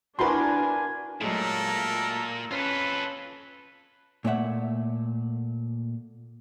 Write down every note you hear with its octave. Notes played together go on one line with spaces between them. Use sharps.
D4 E4 F#4 A#4 B4 G#5 C6
A#2 F#3 G#3 A3 A4 A#4
C#4 F4 A4 B4
A#2 A3 C#5 E5 F#5